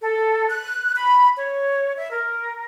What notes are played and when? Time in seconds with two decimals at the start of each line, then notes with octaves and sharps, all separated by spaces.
0.03 A4
0.49 F#6
0.95 B5
1.36 C#5
1.96 E5
2.11 A#4